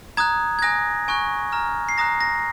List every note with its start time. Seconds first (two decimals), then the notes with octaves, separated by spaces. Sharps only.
0.17 A#5 D#6 F#6 G#6
0.59 G#6
0.62 G#5 D#6 F#6 A#6
1.08 G#5 C#6 F#6
1.52 A#5 F6
1.89 C7
1.98 A#5 D#6 F#6 A#6
2.21 A#6